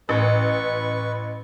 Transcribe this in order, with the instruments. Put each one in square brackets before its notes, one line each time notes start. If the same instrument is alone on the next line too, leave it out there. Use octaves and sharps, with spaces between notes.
[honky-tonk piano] A1 [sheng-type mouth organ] B4 C#6